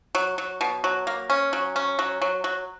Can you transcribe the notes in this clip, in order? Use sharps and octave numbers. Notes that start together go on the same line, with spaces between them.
F#3
F#3
B2
F#3
A#3
C#4
F#3
C#4
F#3
F#3
F#3